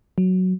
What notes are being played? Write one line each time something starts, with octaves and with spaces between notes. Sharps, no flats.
F#3